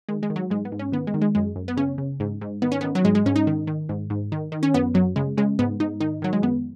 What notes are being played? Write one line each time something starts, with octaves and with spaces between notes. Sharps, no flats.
D#3 G#3
G#3
D#3
F#3
G#2 G#3
B3
G#2
C#4
D#3 B3
G#3
D#3
G#3
F#2 G#3
F#2
B3
C#3 C#4
C#3
G#2
G#2
D#3 B3
C#4
B3
D#3
F#3
G#2 G#3
G#3
G#2 C#4
D#4
D#3
D#3
G#2
G#2
D#3
D#3
C#4
F#2 B3
F#2 F#3
C#3 G#3
C#3 G#3
G#2 B3
G#2 D#4
D#3 D#4
D#3 F#3
G#3
F#2 B3